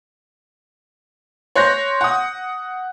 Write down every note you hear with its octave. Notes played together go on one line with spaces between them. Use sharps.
C#5 C6 F#6 G6 A#6
F#5 D#6